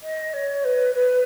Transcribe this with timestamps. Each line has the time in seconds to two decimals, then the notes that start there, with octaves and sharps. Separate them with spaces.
0.02 D#5
0.33 C#5
0.64 B4
0.94 B4